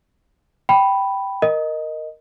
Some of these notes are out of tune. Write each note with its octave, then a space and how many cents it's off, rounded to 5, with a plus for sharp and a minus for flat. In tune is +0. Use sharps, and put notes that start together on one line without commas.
G5 -10 B5 +0
A#4 +0 D#5 +0